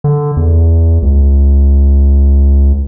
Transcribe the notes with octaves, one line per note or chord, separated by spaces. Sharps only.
D3
E2
C#2